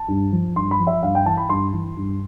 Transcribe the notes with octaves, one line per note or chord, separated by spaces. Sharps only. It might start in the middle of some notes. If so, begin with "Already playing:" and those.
Already playing: A5
G2
F3
G2 C6
B5
F3
E5
G2 F5
G5
E3 A5
B5
G2 C6
E3
G2